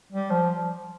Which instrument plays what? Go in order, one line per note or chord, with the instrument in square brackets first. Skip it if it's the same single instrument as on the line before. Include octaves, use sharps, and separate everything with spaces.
[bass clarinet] G3
F3